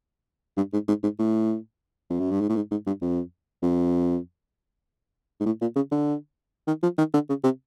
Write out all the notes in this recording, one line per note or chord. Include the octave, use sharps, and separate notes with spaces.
G2
G#2
G#2
G#2
A2
F2
F#2
G2
G#2
A2
G#2
G#2
G2
F2
F2
G#2
A2
A#2
C#3
D3
D#3
F3
D#3
D3
C#3
C3